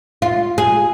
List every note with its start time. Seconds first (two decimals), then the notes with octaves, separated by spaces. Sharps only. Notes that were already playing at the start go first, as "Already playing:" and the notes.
0.22 F4
0.58 G#4